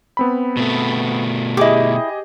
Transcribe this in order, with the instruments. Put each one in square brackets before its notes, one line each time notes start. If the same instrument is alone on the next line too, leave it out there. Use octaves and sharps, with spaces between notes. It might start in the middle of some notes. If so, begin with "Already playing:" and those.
[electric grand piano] B3 C4 B5
[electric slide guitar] B2 A3
[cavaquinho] E4 D6 [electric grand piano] G4 G#4 D#5